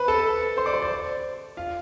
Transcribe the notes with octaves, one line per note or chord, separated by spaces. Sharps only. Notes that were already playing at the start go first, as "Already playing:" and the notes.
Already playing: B4 C5 B5
A4 A5
C5 C6
D5 D6
C5 C6
D5
F4 F5